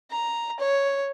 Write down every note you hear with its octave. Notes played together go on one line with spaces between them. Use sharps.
A#5
C#5